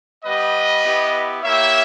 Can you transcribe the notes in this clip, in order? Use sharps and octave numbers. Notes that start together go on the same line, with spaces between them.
G3 B3 G4 B4 D#5
B3 E4 G4
A#3 E4 G4 C#5 E5